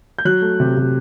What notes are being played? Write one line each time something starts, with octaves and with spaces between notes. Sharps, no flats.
G6
F#3 F#6
A3
C3
C3